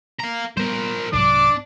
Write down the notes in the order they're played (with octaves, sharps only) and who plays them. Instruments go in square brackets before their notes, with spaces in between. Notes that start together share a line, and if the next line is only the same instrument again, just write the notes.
[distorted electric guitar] F5 A#5
[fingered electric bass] G3 B3 [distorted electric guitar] A#4 C5
[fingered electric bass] C2 G#2 F#3 [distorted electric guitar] D4 [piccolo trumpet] D6